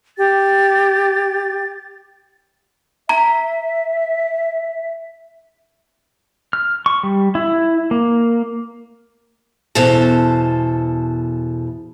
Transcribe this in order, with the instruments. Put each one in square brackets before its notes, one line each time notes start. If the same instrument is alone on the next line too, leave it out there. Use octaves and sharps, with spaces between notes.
[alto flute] G4 [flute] A6
[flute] E5 [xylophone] A#5
[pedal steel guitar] F6
C#6
G3
E4
A#3
[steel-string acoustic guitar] E2 B2 A4 C5 A5